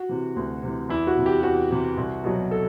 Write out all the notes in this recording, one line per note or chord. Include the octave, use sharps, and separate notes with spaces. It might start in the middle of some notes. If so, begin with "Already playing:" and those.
Already playing: F#4
C3 E3
D2
C3 E3
E2 E4
F#4
C3 E3
G4
E2 F#4
C3 E3
C2
B2 F#3
A4